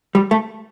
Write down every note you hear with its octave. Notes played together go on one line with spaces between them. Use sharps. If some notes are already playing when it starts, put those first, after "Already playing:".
G3
A3